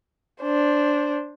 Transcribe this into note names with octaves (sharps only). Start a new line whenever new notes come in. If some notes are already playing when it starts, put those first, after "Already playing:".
D4 C5